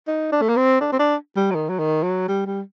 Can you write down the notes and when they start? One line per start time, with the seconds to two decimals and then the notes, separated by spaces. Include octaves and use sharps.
0.07 D#4
0.32 D4
0.41 A3
0.49 A#3
0.56 C4
0.80 D4
0.92 C4
0.99 D4
1.36 G3
1.51 F#3
1.55 D#3
1.69 F#3
1.79 D#3
2.03 F#3
2.28 G3
2.46 G3